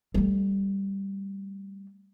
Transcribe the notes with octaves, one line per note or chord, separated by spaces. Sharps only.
G3 A3